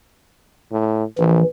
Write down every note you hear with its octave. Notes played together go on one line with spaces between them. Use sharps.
A2
A#1 E3